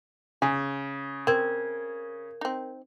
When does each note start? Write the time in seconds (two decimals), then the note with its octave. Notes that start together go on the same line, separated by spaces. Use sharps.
0.42 C#3 G#4
1.27 C4 A#4 G#6
2.41 C4 D#4